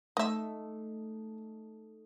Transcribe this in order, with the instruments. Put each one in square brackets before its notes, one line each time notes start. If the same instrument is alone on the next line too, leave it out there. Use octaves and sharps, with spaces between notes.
[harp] A3 D#4 [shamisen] D#5 E5